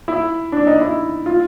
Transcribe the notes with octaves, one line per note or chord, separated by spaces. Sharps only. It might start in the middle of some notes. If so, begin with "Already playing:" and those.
E4
D4
D#4
E4
F4